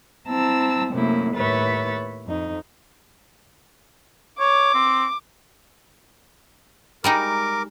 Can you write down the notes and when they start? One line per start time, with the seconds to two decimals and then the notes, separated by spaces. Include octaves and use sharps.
0.27 C4 E4 A5 A#5 E6
0.92 F#2 C3 A3 A#3 E4
1.35 D#2 A2 B4 C#5 E5 A6
2.25 F2 D#4
4.40 C#5 D6
4.74 C4
7.04 G3 G#3 D#4 A#4 D6